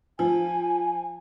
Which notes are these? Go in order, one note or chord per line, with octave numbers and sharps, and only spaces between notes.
F3 G#5